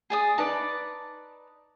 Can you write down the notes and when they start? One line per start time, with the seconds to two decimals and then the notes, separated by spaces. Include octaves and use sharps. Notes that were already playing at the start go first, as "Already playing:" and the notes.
0.10 G#4 D5 D#6
0.38 D#4 B4 D5 A5